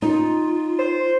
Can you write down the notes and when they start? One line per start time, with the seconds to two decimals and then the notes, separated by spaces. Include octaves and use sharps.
0.02 D#4 F4
0.79 C5